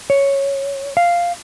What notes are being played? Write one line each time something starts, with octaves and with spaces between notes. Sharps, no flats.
C#5
F5